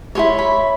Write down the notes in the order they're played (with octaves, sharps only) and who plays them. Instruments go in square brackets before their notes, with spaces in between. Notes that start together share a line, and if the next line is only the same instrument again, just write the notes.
[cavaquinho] E4 G#4 C#5 C6
B5